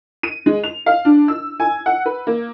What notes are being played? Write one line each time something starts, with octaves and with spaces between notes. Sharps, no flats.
D#7
G#3
F7
F5
D4
E6
G#5
F#5
B4
A#3